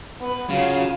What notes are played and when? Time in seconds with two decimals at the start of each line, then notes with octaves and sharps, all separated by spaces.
0.21 B3 B4
0.50 C#3 F#3 F4 F5